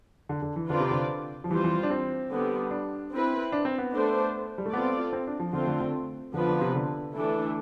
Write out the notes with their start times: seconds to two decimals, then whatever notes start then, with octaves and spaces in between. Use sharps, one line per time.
0.29 D3
0.42 D3
0.56 E3
0.69 D3 C4 F4 B4 D5
0.80 C3
0.91 D3
1.44 F3
1.50 E3 G3 C4 F4 C5
1.64 E3
1.83 D4
1.90 C4
2.31 D3 G3 B3
2.71 D4
3.12 C4 E4 B4
3.52 D4
3.65 C4
3.78 B3
3.92 A3 D4 A4 C5
4.58 G3
4.66 A3
4.73 B3 C4 F4 A4 D5
5.13 C4
5.27 D4
5.39 F3
5.53 D3 A3 C4 F4
5.67 D3
5.81 D3
6.34 D3 F3 B3 D4 F4 B4
6.48 D3
6.61 C3
6.75 D3
7.15 E3 A3 D4 A4